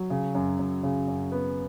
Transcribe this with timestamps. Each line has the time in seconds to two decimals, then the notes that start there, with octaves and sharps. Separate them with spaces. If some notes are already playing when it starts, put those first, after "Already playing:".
Already playing: F#3
0.10 C#3
0.35 F#2
0.59 F#2
0.83 C#3
1.08 F#2
1.32 B3